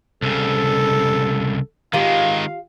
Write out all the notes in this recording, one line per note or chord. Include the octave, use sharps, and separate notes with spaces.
C2 C#3 A4
D#3 G#3 F4 G4 F5